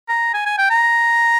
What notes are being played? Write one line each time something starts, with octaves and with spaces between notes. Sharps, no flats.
A#5
G#5
G#5
G5
A#5